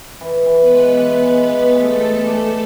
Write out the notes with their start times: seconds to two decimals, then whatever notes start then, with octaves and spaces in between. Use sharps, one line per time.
0.21 E3
0.46 E3
0.58 B3 B4
0.72 G#3
0.97 E3 B3 B4
1.23 G#3
1.49 E3
1.75 A3 G#4 A4
2.00 G#4
2.26 D4